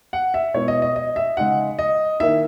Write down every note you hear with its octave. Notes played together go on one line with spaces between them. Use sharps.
F#5
E5
B2 G#3 B3 E4 C#5
D#5
D#5
D#5
E5
C#3 G#3 D#4 F#5
D#5
D#3 A#3 E4 E5